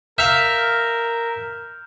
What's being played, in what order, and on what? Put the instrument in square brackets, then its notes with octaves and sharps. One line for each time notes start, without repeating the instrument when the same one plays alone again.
[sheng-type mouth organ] A#4 [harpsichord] E5 F5 [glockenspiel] F6 G6